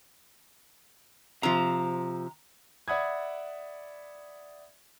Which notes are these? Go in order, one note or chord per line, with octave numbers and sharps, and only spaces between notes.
C3 F3 A#5
D5 E5 F#5 B5 D#6 G#6